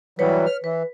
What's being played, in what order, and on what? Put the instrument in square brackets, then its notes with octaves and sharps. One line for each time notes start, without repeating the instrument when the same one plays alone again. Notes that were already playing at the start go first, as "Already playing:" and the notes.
[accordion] E3 F#3 G3 [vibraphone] B4 C#5
[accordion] F6
[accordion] E3 [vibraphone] B4